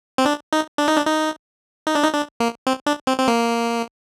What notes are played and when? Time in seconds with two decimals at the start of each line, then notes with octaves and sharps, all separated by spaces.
0.18 C4
0.25 D4
0.53 D#4
0.78 D4
0.88 D#4
0.97 D4
1.06 D#4
1.87 D#4
1.95 D4
2.03 D#4
2.14 D4
2.40 A#3
2.67 C4
2.86 D4
3.07 C4
3.19 C4
3.28 A#3